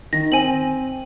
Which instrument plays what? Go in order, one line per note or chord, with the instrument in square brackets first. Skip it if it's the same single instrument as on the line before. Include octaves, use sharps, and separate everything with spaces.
[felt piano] D#3 [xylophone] A#6
[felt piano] C4 [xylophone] G#5 F#7